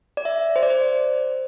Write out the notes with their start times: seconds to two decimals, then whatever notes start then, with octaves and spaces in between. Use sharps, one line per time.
0.17 D5
0.25 E5
0.56 C5
0.63 D5
0.70 C5